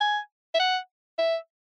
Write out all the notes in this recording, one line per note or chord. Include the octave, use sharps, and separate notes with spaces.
G#5
E5
F#5
E5